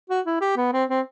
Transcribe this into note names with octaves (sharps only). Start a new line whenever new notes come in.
F#4
E4
G4
B3
C4
C4